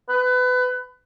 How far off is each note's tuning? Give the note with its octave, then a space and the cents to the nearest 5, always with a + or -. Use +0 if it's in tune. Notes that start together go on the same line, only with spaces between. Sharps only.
B4 +25